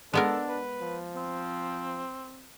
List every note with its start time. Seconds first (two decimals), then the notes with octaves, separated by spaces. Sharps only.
0.14 G#3 B3 D4 A4 A#4
0.48 B4
0.81 F3
1.16 C4